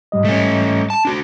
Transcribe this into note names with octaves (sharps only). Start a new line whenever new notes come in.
G#2 G3 D#5
A3 C#4
A5
D4 F#4